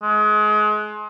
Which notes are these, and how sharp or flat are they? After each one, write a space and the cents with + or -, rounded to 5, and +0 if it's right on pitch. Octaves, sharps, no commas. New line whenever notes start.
G#3 +30